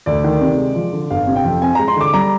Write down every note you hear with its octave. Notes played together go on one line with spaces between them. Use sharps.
D2 D5
D#3
C3
G#3
F3
D3
G1 F5
C3
G5
F2
C4 G#5
G#3 A#5
C6
D3 D6
G3 A#5